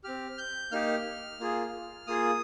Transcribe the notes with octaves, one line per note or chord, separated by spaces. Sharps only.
C4 G4 F6
G6
A#3 D#4 G4 F6
A#3 F4 G#4
A#3 F4 G#4 D#6